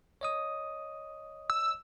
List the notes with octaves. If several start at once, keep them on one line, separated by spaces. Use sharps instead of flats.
C#5 D#5 D#6
E6